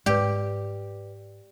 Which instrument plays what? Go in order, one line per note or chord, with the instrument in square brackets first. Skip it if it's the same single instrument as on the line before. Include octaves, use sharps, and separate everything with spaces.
[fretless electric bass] G#2 G#3 [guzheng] G4 [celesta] B4 D5